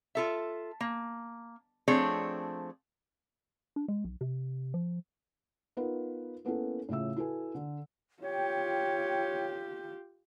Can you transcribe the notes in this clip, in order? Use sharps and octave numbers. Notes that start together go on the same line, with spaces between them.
F4 A4 E5
A#3
F3 A3 C4 D4 G#4 C#5
D4
G#3
B1
C3
F3
B3 D#4 F4 A#4 B4
A#3 B3 C#4 E4 A4
A2 C#3 F4 E5 E6
E4 F#4 A4 B4 G#5
D3
F4 G4 C#5 G5